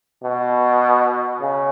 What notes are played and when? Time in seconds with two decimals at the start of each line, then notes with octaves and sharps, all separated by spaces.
0.24 B2
1.42 C#3